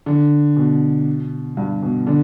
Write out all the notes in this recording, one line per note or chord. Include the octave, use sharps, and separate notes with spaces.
D3
B2
G2
B2
D3